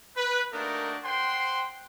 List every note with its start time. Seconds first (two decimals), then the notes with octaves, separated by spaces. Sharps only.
0.16 B4
0.52 A3 A#3 D4 D#4 F#4 A#4
1.04 C5 F#5 G5 C6